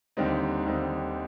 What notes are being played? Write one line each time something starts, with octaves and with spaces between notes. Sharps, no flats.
D#2 D3 G3 C4 D#4
D#2 D3 G3 C4 D#4